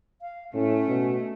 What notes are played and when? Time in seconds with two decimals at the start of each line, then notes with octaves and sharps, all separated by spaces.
0.21 F5
0.53 A2 A3 C#4
0.88 B2